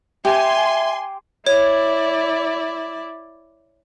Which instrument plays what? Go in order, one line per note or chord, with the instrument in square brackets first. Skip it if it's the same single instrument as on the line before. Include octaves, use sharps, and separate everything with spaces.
[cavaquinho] G4 [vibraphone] E5 [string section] G#5 C6
[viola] E4 D5 [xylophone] C#5